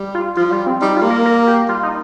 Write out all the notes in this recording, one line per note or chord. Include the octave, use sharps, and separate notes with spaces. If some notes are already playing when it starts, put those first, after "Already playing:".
Already playing: G3
F4
F3 F4
G3 F4
C4
G3 D#4
F4
A#3
A#4
A#4
G4
G3 F4
D#4